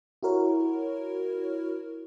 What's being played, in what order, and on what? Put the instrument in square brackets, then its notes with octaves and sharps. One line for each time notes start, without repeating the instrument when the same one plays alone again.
[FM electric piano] E4 F#4 A#4 C#5